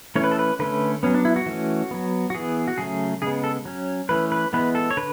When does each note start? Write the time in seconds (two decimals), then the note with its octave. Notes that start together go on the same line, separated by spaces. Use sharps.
0.16 E3 A3 C#4 C#5
0.24 B4
0.31 A4
0.39 B4
0.59 D3 A3 C#4 B4
1.03 F#3 B3 C#4
1.14 D4
1.25 E4
1.36 F#4
1.46 E3 A3 C#4
1.91 F#3 B3
2.30 F#4
2.34 E3 B3 G#4
2.68 F#4
2.78 C#3 F#3 A3 C#4 G#4
3.22 C#3 G#3 B3 G#4
3.44 A4
3.65 F#3 C#4
4.09 E3 A3 C#4 B4
4.32 B4
4.53 E3 G#3 B3 B4
4.75 A4
4.91 C#5
4.97 D3 B4